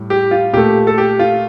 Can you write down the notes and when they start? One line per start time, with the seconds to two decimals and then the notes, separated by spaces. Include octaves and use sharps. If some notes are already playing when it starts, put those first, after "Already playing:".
Already playing: A2 G3
0.10 G4
0.31 F4
0.53 A#2 A3 G4
0.87 A4
0.98 G4
1.19 F4